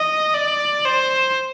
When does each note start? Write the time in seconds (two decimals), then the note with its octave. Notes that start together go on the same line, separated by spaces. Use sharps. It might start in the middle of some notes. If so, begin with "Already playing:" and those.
Already playing: D#5
0.34 D5
0.86 C5